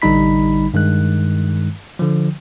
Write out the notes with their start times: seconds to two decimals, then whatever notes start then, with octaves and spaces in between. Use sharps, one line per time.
0.02 A1 D3 G3 D#4 B5 B6
0.74 G2 D#3 G#3 F#6
1.99 D3 F3